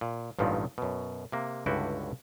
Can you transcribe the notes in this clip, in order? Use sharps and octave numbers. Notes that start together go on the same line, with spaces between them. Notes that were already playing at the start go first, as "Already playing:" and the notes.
A#2
A1 G2 A#2 D#3 F3 F#3
F#2 B2
C3 A#3
C#2 G2 D3 E4 F#4 G5